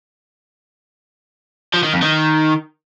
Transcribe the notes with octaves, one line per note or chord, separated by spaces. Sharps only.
F3
D#3
F2
D#3